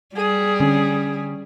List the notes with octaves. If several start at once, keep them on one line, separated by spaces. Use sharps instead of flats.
G3 G#4
D3 C#4